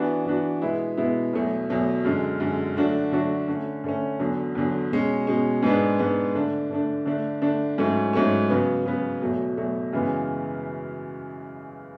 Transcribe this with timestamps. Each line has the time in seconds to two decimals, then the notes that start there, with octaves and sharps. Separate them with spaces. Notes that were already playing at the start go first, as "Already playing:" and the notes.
Already playing: E3 B3 D4 F#4
0.25 E3 B3 D4 F#4
0.62 B2 G#3 B3 E4
0.97 B2 G#3 B3 E4
1.33 E2 B2 F#3 A3
1.70 E2 B2 F#3 A3
2.04 F#2 D3 G#3
2.40 F#2 D3 G#3
2.76 D3 F#3 A3 D4 F#4
3.12 D3 F#3 A3 D4 F#4
3.48 D3 A3 C#4
3.84 D3 A3 C#4
4.19 E2 D3 F#3
4.55 E2 D3 F#3
4.91 B2 G#3 C#4
5.27 B2 G#3 C#4
5.63 G#2 G#3 B3 D4
5.99 G#2 G#3 B3 D4
6.35 D3 A3 D4
6.71 D3 A3 D4
7.06 D3 A3 D4
7.42 D3 A3 D4
7.78 G#2 F#3 A3 C#4
8.13 G#2 F#3 A3 C#4
8.50 C#3 F#3 B3
8.86 C#3 F#3 B3
9.21 E2 B2 F#3 A3
9.57 E2 B2 F#3 A3
9.93 F#2 C#3 E3 G#3 B3